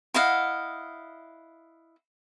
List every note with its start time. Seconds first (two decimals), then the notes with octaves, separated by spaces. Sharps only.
0.14 E4 D#5 F5 F#5